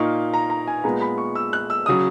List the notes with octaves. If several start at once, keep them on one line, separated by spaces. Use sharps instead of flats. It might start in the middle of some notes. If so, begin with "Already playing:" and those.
Already playing: A#2 A#3 D#4 C#6
A#5
A#5
G#5
A#2 G#3 B3 A#5
B5
C#6
E6
F#6
E6
C#3 F#3 D#6